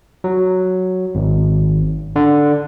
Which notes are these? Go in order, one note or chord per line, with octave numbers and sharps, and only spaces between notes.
F#3
G#1
D3